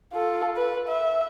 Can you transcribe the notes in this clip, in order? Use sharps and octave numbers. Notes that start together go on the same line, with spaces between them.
F4 A4
B4
E5